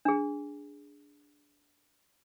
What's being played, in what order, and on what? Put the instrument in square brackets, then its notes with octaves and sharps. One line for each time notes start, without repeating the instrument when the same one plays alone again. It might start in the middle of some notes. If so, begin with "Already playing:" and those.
[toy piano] D4 G#4